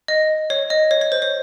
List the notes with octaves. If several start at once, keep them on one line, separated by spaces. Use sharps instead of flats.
D#5
C#5
D#5
C#5
C#5
C5
C#5